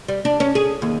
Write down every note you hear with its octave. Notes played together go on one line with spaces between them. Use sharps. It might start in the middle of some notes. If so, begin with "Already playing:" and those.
G3
D4
C#4
G#4
D#2